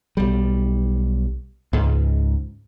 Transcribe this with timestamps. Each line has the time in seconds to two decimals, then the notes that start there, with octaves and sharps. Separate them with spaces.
0.17 B1 G3
1.73 C#2 G#2